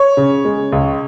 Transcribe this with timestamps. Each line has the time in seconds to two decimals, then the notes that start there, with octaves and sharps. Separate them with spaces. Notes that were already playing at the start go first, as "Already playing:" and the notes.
Already playing: C#5
0.17 C#3
0.45 G#3
0.72 C#2